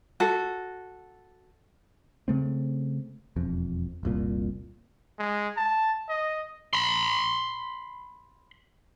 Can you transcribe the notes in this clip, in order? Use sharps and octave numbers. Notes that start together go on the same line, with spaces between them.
F#4 A4
C#3 A3 C4
E1 F2
F1 C2 A#2
G#3
A5
D#5
B5 C6